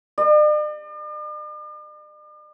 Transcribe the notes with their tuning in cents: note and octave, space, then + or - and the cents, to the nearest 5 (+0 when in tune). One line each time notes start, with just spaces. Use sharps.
D5 +45